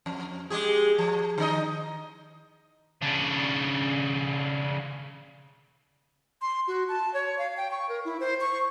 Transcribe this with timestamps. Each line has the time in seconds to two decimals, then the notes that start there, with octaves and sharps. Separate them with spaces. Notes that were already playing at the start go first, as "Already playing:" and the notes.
0.06 F2
0.50 G#3 G4 G#4
0.98 F3
1.38 D#3 D#4 D#5
3.02 C#3 D4
6.42 C6
6.68 F#4
6.89 A5
7.14 C#5
7.39 F5
7.57 G5
7.71 C#6
7.89 A#4
8.05 E4
8.20 C5
8.41 C#6